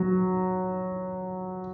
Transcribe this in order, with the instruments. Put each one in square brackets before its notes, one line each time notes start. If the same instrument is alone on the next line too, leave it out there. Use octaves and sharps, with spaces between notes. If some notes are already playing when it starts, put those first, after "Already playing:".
Already playing: [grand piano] F#3